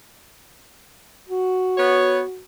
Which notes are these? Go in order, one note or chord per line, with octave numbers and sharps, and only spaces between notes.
F#4
B3 C#5